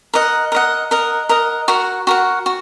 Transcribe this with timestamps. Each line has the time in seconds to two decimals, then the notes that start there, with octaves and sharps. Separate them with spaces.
0.14 A#4 D#5 F#5
0.52 A#4 D#5 F#5
0.91 A#4 D#5 F#5
1.29 A#4 D#5 F#5
1.68 F#4 A#4 F#5
2.07 F#4 A#4 F#5
2.46 F#4